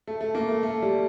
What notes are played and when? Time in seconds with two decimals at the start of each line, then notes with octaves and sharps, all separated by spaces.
0.07 A3
0.21 A3
0.35 A#3
0.49 A3
0.63 A3
0.82 G3